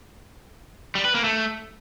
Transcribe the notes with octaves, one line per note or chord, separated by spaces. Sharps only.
G3
B4
A#3
A3